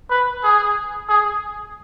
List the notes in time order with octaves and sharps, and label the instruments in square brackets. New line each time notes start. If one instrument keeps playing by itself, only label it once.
[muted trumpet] B4
G#4
G#4